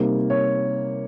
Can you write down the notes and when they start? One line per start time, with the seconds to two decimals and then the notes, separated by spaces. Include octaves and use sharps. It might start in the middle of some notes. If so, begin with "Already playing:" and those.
Already playing: C3 G3 A#3 D#4
0.30 C#5